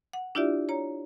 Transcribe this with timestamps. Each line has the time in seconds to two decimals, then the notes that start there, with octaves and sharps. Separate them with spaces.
0.13 F#5
0.35 D4 E4 F4 G4 D5 E5
0.69 C#5 A#5